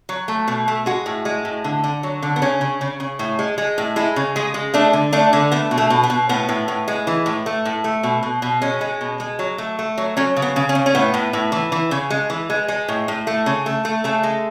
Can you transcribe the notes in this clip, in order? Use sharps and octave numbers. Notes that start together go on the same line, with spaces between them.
F#3
A3
B2
A3
G#3 F#4
A2
G#3
A2
D3
D3
F#3
D3
B3
C#3 C#4
C#3
C#3
C#3
A2
G#3
G#3
A2
G#3 E4
C#3
G#3 G#4
G#3
A3 D4
D3
A3 D4
D3
A3 B3
B2
A3
B2
B3
B2
A2 B3
A2
A2
G#3
E3
A2
A3
A2
A3
B2
B2
B2
G#3 C#4
G#3
B2
G#3
F#3
A3
A3
F#3
F#3 C#4
C#3
B3
C#3
C#4
C#3
C#4
A2 B3
A2
A2
E3
E3
C#3
G#3
E3
G#3
G#3
A2
A2
A3
C#3
A3
A3
C#3 A3
G#3